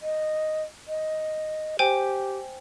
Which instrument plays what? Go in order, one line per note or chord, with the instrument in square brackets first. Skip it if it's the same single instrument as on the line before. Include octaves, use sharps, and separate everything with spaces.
[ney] D#5
D#5
[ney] G4 [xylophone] C5 G5 G#5